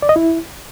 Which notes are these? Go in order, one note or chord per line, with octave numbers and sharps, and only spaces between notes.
D5
D#5
E4